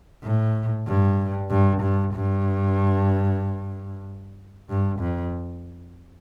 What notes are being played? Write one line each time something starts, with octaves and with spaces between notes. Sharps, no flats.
A2
G2
G2
G2
G2
G2
F2